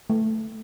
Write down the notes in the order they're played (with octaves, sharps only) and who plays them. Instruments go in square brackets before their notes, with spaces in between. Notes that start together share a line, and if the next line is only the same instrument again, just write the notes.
[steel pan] A3